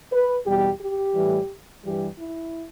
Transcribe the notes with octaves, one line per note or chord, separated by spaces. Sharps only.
B4
E2 B2 G3 G4
G4
A2 E3 G3
G2 E3 G3 G4
E4